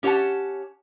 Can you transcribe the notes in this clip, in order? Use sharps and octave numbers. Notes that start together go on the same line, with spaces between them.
C#4 G4 C#5 E5 F#5 A5